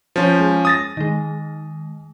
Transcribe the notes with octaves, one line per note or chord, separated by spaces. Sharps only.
F3 C#4 C5
G#3
D#6 A6 A#6
D#3 G#3